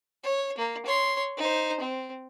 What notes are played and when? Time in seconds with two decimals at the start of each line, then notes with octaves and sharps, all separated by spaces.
0.24 C#5
0.58 A#3
0.86 C#5 C6
1.37 D#4 C5
1.80 C4